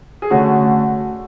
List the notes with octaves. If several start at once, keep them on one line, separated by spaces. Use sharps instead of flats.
G#4
D3 A3 C#4 F#4